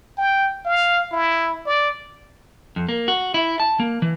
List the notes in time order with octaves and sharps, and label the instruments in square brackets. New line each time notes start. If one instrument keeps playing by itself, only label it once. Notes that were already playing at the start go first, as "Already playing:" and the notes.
[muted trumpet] G5
F5
E4
D5
[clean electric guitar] F2
A#3
F#4
E4
A5
A#3
E3